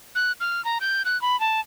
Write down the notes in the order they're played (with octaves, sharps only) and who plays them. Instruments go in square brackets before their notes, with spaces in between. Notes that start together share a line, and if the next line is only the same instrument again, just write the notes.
[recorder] F#6
F6
A#5
G6
F#6
B5
A5